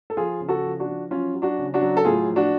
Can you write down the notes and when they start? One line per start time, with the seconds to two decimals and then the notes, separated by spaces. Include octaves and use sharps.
0.10 A4
0.17 F3 F4 G#4
0.40 C#3
0.48 F#4 A4
0.64 F3
0.80 D4 F#4
0.88 F3
1.11 F#3 C#4 F4
1.35 F#3
1.42 D4 F#4
1.58 C#3
1.74 D4 F#4
1.81 F#3
1.97 A4
2.05 A2 F4 G#4
2.29 F3
2.36 D4 F#4